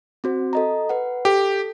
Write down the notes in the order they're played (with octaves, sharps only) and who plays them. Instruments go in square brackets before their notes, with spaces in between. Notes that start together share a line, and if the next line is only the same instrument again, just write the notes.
[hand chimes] C4 F#4 C5
A4 D#5 A#5
B4 F#5
[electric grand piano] G4 [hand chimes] A4